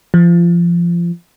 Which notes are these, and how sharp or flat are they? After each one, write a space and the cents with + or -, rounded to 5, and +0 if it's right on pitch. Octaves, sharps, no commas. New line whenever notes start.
F3 -25